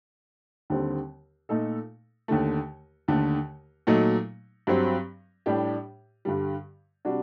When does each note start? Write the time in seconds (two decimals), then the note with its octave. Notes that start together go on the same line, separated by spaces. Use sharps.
0.70 D#2 D3 G3 C4
1.49 A#2 A3 D#4 A4
2.28 D#2 D3 A3
3.08 D#2 D3 A3
3.87 A#2 F#3 A3 D#4
4.67 G2 F#3 C4
5.46 A2 G3 D4 G4
6.25 G2 D3 G3
7.05 C3 G3 D4 F#4